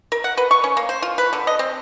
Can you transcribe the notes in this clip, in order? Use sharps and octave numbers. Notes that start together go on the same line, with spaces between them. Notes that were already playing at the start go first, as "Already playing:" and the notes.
A#4
F#5
B4
C#6
C#4
A#3
C5
F4
B4
D3
D#5
C4